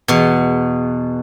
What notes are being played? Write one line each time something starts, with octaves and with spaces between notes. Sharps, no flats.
E2 B2